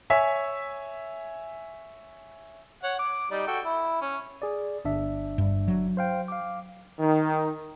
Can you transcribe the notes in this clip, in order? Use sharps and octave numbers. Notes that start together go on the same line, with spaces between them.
C#5 E5 G#5 E6 B6
C#5 F#5
D6
G3 D#4 D5
F#4 A4 G5
E4
C#4
G#4 D5
G1 D4 E5
G2
F#3
C5 F5 G5
F5 D6
D#3